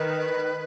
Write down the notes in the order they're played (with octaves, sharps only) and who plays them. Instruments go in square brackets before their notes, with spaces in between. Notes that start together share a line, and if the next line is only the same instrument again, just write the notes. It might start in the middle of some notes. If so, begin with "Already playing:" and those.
Already playing: [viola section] D#3 [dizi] B4